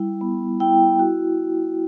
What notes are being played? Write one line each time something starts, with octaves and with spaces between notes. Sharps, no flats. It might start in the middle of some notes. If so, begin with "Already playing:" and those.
Already playing: G3 E4
B3
E4 G5
F#4